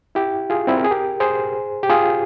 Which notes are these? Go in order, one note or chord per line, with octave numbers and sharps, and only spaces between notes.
E4 G4
F4 G#4
C4 E4
A#4
G#4
G4 A#4
G#4 C5
G4
F4 G#4